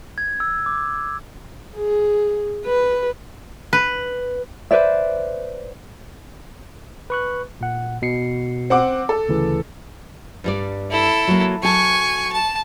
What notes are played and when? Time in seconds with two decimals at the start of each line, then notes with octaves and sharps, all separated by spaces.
0.18 G#6
0.40 E6
0.66 D6
1.75 G#4
2.65 B4
3.73 B4
4.71 B4 C5 D5 E5
7.10 B4 C#6 F#6
7.61 A#2 F#5
8.02 B2 C7 C#7
8.70 C4 F#5 D6
9.09 A4
9.28 D2 C#3 E3
10.44 G2 G3 D5
10.91 E4 A4
11.27 F#3 A#3
11.63 F#3 A4 G#5 C#6
12.32 A5